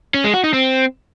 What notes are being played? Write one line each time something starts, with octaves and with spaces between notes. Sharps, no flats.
C#4
G#3
F#4
D#4
C4